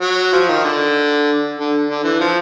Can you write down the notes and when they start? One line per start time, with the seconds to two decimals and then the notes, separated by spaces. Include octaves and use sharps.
0.02 F#3
0.33 F3
0.49 D#3
0.64 D3
1.58 D3
1.89 D3
2.04 E3
2.20 F3